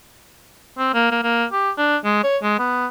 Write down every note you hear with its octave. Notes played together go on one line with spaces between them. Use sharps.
C4
A#3
A#3
A#3
G4
D4
G#3
C#5
G#3
B3